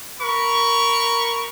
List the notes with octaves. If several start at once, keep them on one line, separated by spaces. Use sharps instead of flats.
A#4 B5 C#6